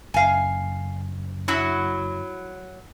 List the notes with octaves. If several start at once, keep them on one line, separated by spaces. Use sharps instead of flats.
F#1 F5 G#5
F#3 E4 F#4